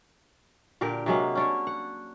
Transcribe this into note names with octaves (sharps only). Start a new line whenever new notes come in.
A#2 D3 G4 A#4
C3 F#3 G#3 A#3
C#4 D4 C#5
F#5